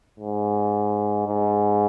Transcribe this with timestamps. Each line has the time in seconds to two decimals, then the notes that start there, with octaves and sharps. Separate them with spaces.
0.20 G#2
1.27 G#2